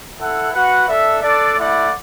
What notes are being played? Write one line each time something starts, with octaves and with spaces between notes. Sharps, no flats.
E4 A4 F#5
F#4 B4 F#5
D4 A4 E5
D4 A4 D5
A3 E4 D5 F#5